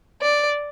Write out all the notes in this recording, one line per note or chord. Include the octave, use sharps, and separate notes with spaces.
D5